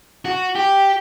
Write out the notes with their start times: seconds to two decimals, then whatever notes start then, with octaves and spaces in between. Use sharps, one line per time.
0.25 F#4
0.55 G4